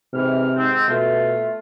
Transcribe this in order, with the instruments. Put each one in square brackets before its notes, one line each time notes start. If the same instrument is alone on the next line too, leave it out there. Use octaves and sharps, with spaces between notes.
[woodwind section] G#2 E3 F6 [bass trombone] C3
[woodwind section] G#2 C4
[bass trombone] B2 [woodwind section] A3 F4